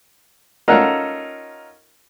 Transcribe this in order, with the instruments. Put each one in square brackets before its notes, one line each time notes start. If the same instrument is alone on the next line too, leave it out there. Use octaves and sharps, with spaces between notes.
[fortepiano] C#4 D#4 F4 A4 A#4 F#5